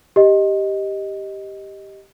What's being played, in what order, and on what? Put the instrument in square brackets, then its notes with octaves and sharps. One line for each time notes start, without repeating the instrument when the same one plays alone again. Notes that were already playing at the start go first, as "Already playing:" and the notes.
[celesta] G4 D#5